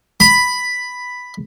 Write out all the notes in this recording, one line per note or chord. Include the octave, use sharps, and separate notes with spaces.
B5